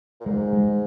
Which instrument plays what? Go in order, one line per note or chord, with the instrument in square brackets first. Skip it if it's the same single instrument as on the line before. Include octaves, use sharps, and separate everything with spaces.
[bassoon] A#2
[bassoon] G#2 [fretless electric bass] G#3
[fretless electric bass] G#3